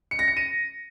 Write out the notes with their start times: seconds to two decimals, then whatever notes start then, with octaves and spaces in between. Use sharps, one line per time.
0.11 C#7
0.19 A#6
0.28 C#7
0.37 D#7